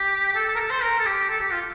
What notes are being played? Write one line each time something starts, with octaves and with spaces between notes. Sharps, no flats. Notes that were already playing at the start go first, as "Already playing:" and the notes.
Already playing: G4
G4
A4
A4
A#4
A4
C5
A#4
A4
G4
A4
G4
F4